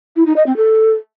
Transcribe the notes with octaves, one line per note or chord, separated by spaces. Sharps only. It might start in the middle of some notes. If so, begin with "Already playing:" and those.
E4
D#4
D#5
C4
A4